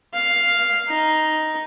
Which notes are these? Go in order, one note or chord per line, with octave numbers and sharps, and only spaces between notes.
F5
D#4